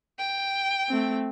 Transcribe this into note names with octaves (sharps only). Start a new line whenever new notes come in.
G5
A3 C4